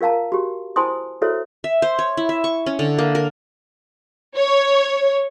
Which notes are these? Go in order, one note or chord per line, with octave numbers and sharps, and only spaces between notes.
F4 A#4 F5 A5 A#5
F#4 G4
E4 C5 G#5 A5 C6 D#6
E4 F#4 A4 C5 C#5 E5
E5
C5
C#5
E4
E5
C#6
C#4
D3
A#3
A#4
C#5